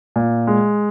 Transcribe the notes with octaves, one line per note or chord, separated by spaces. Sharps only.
A#2
G#3